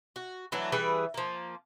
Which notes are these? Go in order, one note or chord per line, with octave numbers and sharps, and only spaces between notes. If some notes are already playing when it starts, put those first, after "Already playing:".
F#4
E3 F#3 A3 D4
E3 G3 G#4 B4
F3 A#3